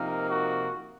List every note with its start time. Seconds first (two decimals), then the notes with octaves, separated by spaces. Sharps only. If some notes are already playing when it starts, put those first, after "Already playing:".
Already playing: C3 F3 A#3 D#4 A#4
0.30 F#4